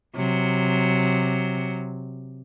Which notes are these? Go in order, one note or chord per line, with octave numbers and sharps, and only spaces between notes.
C3 F#3